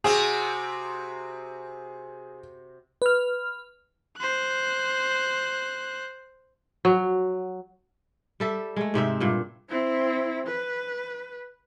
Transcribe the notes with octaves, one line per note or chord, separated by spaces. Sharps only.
C3 C4 F#4 G#4
B4 F6
C5 F#6
F#3
G3 A4 E5
G#3 A3
G#2 C3 C4 E5
G2 A#2
C4 E4
B4